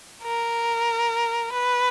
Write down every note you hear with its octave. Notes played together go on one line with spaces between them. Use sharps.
A#4
B4